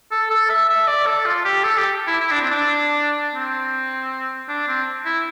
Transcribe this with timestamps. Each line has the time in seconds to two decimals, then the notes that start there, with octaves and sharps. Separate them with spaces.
0.11 A4
0.30 A4
0.50 E5
0.70 E5
0.87 D5
1.06 A4
1.26 F4
1.45 G4
1.64 A4
1.78 G4
2.07 E4
2.21 E4
2.31 D4
2.41 C4
2.51 D4
3.35 C4
4.49 D4
4.68 C4
5.05 E4